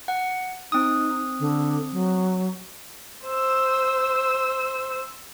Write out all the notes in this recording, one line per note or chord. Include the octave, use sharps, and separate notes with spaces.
F#5
C4 D#4 D#6
D3
F#3
C5 E6